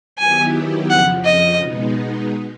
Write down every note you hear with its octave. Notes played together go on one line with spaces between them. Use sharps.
D#3 F#3 B3 E4 G4 G#5
F2 C#3 F3 F#5
D#5
B2 G#3 B3 D#4